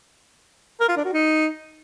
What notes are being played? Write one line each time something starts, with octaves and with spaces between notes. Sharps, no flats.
A#4
F4
D4
F#4
D#4